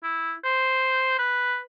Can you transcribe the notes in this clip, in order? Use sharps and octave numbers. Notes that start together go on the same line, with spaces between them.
E4
C5
B4